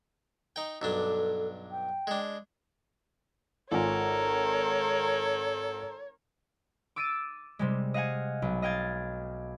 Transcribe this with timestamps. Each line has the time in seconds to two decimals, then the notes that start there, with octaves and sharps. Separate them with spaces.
0.56 D#4 G5
0.82 B1 G2 D4 A4
1.71 G5
2.07 G#3 D4
3.72 G#1 F4 A4 A#4 C#5 G#5
6.96 D6 E6 A6 D7 D#7
7.59 C3 G3 G#3
7.94 D#5 F5 F#5 G#5
8.42 B1
8.62 D#5 F5 G5 G#6 A6